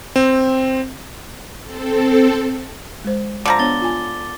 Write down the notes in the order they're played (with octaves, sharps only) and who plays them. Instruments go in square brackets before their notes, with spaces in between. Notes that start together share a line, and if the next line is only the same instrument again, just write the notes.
[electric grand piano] C4
[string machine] C4 A4
[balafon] G#3 C5
[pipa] D3 F3 A#5 [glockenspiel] D6
[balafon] B3 D4 C#5 [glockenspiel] A6 G7
[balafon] F4 G#5